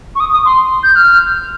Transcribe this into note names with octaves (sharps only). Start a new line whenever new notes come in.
C#6
D#6
D#6
C6
G6
F6